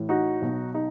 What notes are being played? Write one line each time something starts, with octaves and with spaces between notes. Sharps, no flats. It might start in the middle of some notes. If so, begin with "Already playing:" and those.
Already playing: A1 A2 E3
D#4 F#4
B1 B2
D#4